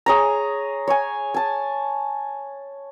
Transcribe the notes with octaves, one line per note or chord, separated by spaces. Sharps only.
G#4 C#5 A#5
C#5 G#5
G#5 A5